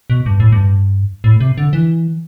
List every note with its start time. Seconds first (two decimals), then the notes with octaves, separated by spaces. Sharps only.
0.10 B2
0.26 G2
0.40 A2
0.52 G2
1.24 A2
1.40 C3
1.58 D3
1.73 E3